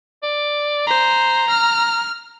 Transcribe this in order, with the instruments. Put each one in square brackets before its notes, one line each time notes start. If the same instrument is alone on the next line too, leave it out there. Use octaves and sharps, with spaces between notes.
[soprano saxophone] D5
[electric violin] C5 [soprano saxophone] A#5
[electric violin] F6